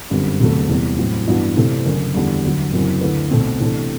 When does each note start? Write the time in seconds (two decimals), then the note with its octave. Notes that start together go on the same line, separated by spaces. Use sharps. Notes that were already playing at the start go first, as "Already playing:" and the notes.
0.10 G1 F#2 D3 G3 C4
0.40 E1 D2 C3 F#3 A3
0.69 E2 C3 G3
0.99 A2 F#3 C4 E4
1.27 G2 E3 B3 D4 F#4
1.57 C3 E3 A3 C4
1.86 F#1 F#2 D3
2.14 E2 D3 G3
2.43 D2 D3 F#3
2.72 F#1 F#2 F#3 C4 E4
3.01 D2 D3 A3 E4 B4
3.30 B1 B2 A3 C4
3.60 C3 E3 A3 D4 A4